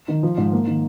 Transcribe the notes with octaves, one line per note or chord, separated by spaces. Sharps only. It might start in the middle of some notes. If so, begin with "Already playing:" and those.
D#3
F3
G#2
A#3
D#3